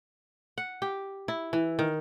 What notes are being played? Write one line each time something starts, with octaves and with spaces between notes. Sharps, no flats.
F#5
G4
E4
E3
D#3